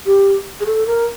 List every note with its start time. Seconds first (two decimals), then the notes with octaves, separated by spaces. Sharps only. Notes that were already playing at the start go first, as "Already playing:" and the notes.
0.06 G4
0.61 G#4
0.66 A4
0.87 A#4